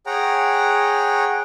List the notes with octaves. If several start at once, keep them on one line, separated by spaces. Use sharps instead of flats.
G#4 C#5 F#5 G5 A#5